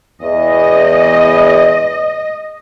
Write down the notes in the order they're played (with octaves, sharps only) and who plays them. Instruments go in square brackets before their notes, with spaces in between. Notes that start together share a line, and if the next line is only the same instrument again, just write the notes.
[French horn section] E2 [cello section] D#5